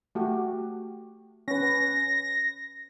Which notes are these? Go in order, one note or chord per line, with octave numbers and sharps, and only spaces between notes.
A3 F#4 G4
C#4 B4 A#6